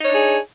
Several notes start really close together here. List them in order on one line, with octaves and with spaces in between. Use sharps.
D#4 C#5 D4 G#4